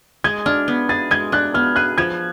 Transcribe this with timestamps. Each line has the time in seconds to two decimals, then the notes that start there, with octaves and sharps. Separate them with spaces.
0.24 G#3 G#6
0.46 D4 F6
0.68 B3
0.89 G#4 A6
1.11 G#3 G#6
1.32 D4 F#6
1.54 B3 F6
1.76 G#4 F#6
1.98 F3 G#6